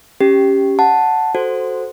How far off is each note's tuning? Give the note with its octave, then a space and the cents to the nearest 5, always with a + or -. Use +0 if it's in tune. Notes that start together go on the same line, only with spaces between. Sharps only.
C#4 +0 G4 +0
F#5 +0 A5 +0
F#4 +0 A4 +0 C5 +0